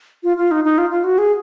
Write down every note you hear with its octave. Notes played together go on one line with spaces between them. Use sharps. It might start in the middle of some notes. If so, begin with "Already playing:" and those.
F4
F4
D#4
D#4
F4
F4
F#4
G#4